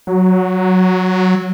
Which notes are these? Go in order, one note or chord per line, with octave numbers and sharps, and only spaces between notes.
F#3